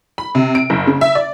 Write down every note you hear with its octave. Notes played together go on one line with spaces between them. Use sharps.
B5
C3
D7
F#1
C#3
E5
D5